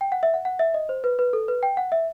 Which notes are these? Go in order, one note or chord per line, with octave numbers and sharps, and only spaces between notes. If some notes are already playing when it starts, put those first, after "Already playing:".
G5
F#5
E5
F#5
F#5
E5
D#5
C5
B4
B4
A4
B4
G5
F#5
E5